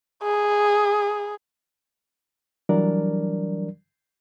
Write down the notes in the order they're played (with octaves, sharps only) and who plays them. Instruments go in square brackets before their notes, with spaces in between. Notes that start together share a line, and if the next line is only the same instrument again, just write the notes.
[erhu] G#4
[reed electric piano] E3 F#3 G3 D4 A#4 D5